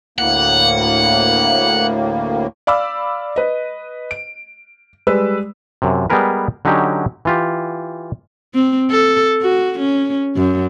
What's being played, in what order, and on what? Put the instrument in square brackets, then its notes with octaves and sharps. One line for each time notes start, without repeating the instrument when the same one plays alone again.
[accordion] D2 A2 A#3 [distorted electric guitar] F#5
[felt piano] D5 F5 B5 D6 E6
B4 D#5
D7
G3 G#3 B4 E6
[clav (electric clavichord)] F#2 C3
G3 G#3 B3 G#4 A#4 B4
D3 F#3 C#4 D#4 G4
E3 F4 G4
[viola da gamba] C4
A4
F#4
C#4
F#2